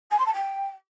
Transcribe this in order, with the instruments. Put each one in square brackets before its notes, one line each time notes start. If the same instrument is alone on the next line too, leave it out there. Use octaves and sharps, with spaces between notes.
[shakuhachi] G#5
C6
A5
G5